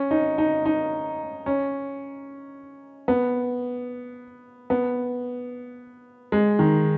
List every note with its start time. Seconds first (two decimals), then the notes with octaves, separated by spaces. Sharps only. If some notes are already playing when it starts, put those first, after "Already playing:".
Already playing: C#4
0.11 D#4
0.38 D#4
0.65 D#4
1.46 C#4
3.08 B3
4.70 B3
6.32 G#3
6.59 D#3